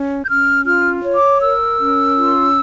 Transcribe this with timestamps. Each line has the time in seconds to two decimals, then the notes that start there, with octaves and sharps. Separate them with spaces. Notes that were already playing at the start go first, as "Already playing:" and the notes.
Already playing: C#4
0.24 G6
0.29 C#4 F6
0.66 F4 F6
1.03 C#5
1.16 D6
1.41 A#4 E6
1.78 C#4
2.15 F4